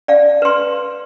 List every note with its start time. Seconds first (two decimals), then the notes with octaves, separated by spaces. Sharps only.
0.08 D5 F5
0.42 B4 C6